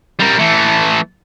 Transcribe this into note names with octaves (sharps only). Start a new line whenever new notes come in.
G3 A#4
E3 A3